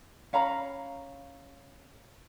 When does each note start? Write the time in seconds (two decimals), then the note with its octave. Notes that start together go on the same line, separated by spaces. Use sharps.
0.33 C#4 F5 A#5 B5